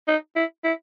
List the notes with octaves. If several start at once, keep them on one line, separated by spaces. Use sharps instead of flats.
D#4
E4
E4